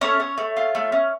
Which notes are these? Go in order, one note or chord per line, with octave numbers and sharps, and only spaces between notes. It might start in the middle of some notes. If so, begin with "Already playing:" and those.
A3 C#4 C#5
C#4
A3
F4
A3
C#4